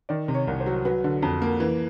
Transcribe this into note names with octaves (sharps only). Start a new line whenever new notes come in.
D#3 D5
C3
C#5
C2
C5
F#3
F#3 B4
D3
F2
A#3
E3